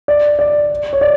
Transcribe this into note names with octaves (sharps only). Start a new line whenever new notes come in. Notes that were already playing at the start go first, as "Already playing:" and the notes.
D5
D5
C#5
D5